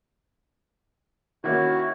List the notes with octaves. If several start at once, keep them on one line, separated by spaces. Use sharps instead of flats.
D#3 A#3 C#4 E4 F#4